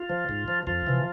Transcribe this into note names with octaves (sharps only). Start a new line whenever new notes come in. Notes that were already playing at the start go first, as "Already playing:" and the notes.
Already playing: F4
F3
G#2
F3
F2 F3 F4
C3 E3